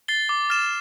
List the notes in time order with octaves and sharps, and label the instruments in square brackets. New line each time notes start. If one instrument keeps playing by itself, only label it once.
[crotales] A6 C7 G7
D6
F6 A6 E7